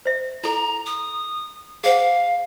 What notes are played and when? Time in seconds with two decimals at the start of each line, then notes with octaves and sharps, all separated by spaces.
0.05 C5 E5
0.44 E4 A4 A#5
0.86 D#6
1.84 G#4 C5 F5 F#5